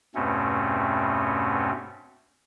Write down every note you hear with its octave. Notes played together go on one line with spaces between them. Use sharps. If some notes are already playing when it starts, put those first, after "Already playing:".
E2 G2 B2 A3 C4 C#4